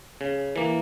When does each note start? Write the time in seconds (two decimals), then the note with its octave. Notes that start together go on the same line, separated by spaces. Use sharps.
0.21 C#3
0.56 E3 A#3